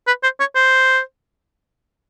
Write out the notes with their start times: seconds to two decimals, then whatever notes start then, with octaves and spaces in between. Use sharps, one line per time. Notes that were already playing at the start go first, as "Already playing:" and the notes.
0.07 B4
0.23 C5
0.40 C#5
0.55 C5